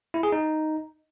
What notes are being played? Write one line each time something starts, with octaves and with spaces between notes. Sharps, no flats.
E4
G#4
D#4